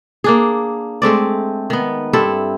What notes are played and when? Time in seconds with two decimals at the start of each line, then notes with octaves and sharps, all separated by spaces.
0.24 A#3 D4 G#4
1.02 G#3 A3 C4 D5
1.70 D#3 B3
2.13 G2 C4 E4 A4